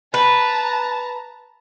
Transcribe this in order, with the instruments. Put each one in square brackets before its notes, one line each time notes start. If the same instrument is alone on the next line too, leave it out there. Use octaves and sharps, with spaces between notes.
[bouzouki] B4 [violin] A5 A#5